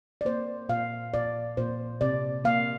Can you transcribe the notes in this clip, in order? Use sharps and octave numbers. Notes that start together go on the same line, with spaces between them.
D5
A#3 C5
A#2 F5
A#2 D5
A#2 C5
C3 D5
A#3 F5